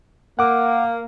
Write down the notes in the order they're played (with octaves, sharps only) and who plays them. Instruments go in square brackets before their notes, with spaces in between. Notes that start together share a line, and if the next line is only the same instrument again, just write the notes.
[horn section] A#3 [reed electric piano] F#5 D6